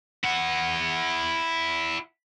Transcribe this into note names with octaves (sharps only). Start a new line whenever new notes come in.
E4 F#5